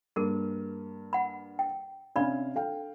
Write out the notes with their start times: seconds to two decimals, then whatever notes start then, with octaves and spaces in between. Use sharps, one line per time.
0.16 G2 A#3 G#4 A#4
1.13 F#5 B5
1.59 G5
2.16 C3 C#4 D4 D5 F5 B5
2.55 A4 F5 G5